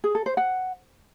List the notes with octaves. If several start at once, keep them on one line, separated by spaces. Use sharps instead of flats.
G#4
A4
C5
F#5